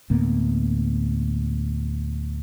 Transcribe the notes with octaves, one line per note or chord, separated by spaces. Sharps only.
D2 A2 A#3 B3